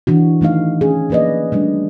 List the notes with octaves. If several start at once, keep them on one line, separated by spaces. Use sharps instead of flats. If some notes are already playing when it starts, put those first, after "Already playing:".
E3 D4 F#4
D#3 A3 D#4 F5
C#4 G#4
F3 A#3 B4 D5 D#5
G3 A3 D4